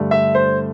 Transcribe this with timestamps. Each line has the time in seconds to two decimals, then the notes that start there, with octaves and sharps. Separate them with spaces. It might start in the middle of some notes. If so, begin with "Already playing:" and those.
Already playing: G2 D3 A3
0.11 E5
0.35 C5